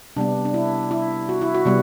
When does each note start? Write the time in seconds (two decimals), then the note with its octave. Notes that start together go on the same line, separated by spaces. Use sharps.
0.16 C3 G3 B3 D4
0.45 D4
0.54 E4
0.91 E4
1.29 F#4
1.41 E4
1.54 F#4
1.65 C3 G3 B3